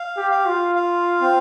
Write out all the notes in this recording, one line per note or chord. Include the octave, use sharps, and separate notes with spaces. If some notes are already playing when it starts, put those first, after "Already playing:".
Already playing: F5
G4
F5
F4
F5
C4